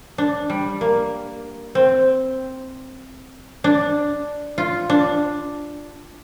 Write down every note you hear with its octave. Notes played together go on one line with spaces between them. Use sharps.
D4
G3
A#3
C4
D4
F4
D4